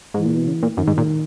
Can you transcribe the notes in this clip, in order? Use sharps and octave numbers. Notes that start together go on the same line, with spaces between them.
G#2 E3
A#2
B2
C#3
A#2
F#2 D#3
G#2
A#2